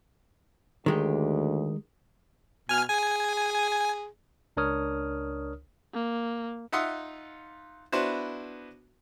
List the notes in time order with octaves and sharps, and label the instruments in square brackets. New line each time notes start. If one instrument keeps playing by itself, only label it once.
[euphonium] D2 [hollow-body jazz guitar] D#3 G#3 G4
[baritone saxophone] B2 [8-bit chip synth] G#5 F6
[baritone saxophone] G#4 [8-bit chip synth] G#5
[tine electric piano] C#2 D4 A#4 C#5 D#6 F6
[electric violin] A#3
[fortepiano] D#4 F4 E5 F#5 C6 D#6
B3 D4 E4 F#4 C5